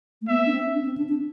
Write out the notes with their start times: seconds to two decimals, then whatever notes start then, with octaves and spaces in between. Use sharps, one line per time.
0.22 A3
0.29 B3 E5
0.46 D4
0.52 C4
0.74 D4
0.85 C4
0.98 D4
1.09 D4